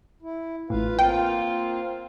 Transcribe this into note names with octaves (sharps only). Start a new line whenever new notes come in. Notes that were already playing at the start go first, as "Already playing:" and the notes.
E4
A1 A2 F4 B4 F5
A#3 C4 F4 G5